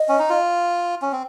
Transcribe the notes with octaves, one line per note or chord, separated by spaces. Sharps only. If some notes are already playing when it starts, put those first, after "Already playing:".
Already playing: D#5
C#4
D#4
F4
C#4
C4